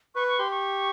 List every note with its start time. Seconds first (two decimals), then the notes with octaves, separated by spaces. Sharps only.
0.15 B4 C#6
0.27 C#6
0.39 G4 C6
0.51 C#6